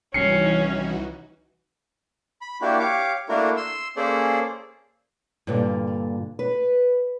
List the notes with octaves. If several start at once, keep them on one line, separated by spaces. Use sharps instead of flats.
C2 E3 G3 C#4 D#4 F#4 C7 C#7
B5
A#3 D4 E4 F#4 G4
G4 C#5 F5 D6
A3 A#3 D4 E4 F#4 A#4
C6 E6
A#3 C#4 G#4 A4 C5 D5
G2 A#2 D3
B4